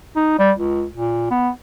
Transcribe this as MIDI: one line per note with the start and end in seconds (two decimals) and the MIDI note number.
0.16 0.38 63
0.39 0.52 55
0.58 0.84 37
0.94 1.26 46
1.31 1.49 59